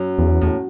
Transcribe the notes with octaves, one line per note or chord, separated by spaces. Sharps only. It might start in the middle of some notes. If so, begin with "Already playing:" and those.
Already playing: F#2
E2
E2 A2